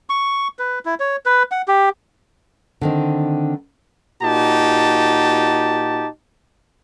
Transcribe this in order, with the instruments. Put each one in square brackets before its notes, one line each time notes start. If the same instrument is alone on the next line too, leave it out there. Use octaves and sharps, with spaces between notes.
[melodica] C#6
B4
E4
C#5
B4
F#5
G4
[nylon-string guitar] D3 D#3 C4
[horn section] A#2 D#4 F#4 G4 A5